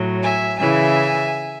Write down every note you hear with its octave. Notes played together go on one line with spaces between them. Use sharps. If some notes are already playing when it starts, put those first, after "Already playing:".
Already playing: A2 F#3
E5 G#5
C#3 E3 E5 G#5